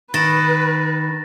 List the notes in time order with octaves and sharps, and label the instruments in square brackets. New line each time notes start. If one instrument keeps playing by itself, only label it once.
[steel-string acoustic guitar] D#3 [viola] B4 [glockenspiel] A6 A#6 E7